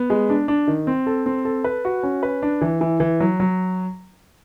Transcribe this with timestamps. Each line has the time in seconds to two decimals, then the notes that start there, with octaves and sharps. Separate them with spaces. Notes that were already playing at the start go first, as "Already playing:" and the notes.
Already playing: B3
0.10 G#3
0.30 D4
0.48 D4
0.68 D#3
0.87 C4
1.06 A4
1.26 C4
1.45 A4
1.64 B4
1.85 F#4
2.03 C#4
2.23 B4
2.43 D4
2.61 E3
2.81 E3
3.00 E3
3.20 F#3
3.40 F#3